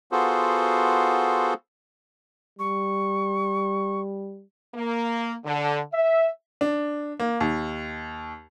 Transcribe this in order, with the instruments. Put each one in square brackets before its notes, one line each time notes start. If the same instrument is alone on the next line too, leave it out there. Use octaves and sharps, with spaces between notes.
[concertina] B3 F4 F#4 G#4 A4 C5
[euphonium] G3 [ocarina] C#6
[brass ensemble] A#3
D3
E5
[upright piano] D4
A#3
D#2